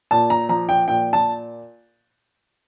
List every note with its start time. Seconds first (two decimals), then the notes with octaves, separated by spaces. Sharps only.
0.11 A#2 A5
0.30 A#5
0.49 F3 A#5
0.69 G5
0.88 A#2 G5
1.13 A5